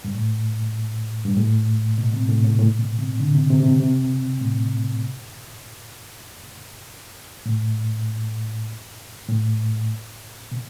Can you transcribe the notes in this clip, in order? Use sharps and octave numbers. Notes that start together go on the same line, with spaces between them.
G2
A2
G2
A2
B2
C3
A2
A2
A2
B2
C3
D3
C3
C3
C3
B2
C3
A2
A2
A2
B2